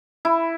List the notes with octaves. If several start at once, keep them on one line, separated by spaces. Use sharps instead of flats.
E4